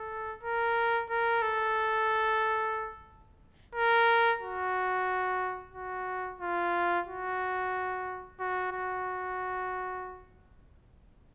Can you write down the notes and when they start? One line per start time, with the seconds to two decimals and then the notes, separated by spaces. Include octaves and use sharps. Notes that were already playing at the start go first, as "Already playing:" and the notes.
Already playing: A4
0.43 A#4
1.10 A#4
1.42 A4
3.75 A#4
4.42 F#4
5.74 F#4
6.41 F4
7.07 F#4
8.40 F#4
8.73 F#4